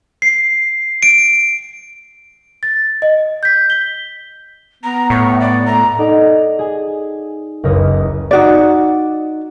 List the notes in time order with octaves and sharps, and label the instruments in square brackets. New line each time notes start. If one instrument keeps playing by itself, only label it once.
[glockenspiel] C7
D7
[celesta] A6
D#5
G6 B6
G7
[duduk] B3 [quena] A#5
[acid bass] A2 [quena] C#6
[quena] D5
[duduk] A3 [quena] A#5
[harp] D#4 A4 D5 F#5
G#4 G#5
F#1 C#2 E4 A#4 C#5 D#6
[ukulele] D#4 F#4 D5